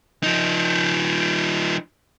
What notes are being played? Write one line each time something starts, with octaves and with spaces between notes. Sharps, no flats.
F3 D#4